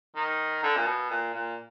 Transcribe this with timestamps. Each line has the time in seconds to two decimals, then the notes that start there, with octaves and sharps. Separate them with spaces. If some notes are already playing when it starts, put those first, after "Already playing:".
0.16 D#3
0.63 D3
0.76 A#2
0.86 B2
1.10 A#2
1.34 A#2